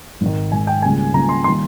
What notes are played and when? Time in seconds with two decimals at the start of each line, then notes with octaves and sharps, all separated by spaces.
0.21 G#1 G#2 D#3
0.52 G#1 G#2 D#3 G#5
0.67 G5
0.82 C#2 C#3 G3 A#3 G#5
1.14 C#2 C#3 G3 A#3 A#5
1.29 C6
1.44 C6
1.48 D#3 G3 A#3